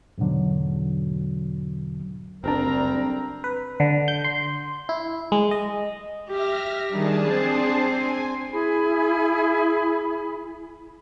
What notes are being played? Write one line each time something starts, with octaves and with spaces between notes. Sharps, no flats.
E2 G#2 B2 D3 F#3
F#1 D2 G3 C4 D4 A#4 A#5
B4
D3
G6
C6
E4
G#3
D#5
G4 E5 F6 A#6
D#3 G3 D4 G#4 A5
C4 C5
G#5
E4 G#4 G#5 B5